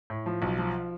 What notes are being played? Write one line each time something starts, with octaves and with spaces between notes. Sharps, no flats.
A2
F3
B1
F3